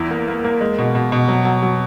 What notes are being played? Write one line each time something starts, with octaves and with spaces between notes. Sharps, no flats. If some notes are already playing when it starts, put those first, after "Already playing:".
Already playing: E2 E4
A#3
A#3
A#3
G#3
B2
B2
B2
F#3
F#3
F#3